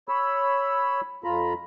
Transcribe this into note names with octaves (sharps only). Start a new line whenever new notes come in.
C#5 B5 E6
F2 F4 A#5 B5